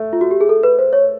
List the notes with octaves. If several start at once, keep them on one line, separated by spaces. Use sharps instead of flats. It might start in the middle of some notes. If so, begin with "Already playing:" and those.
Already playing: A3
F4
F#4
G4
G#4
A4
B4
C5
C#5